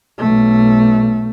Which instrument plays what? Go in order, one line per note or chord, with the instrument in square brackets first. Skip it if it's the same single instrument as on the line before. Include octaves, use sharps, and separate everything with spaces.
[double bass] B1 A3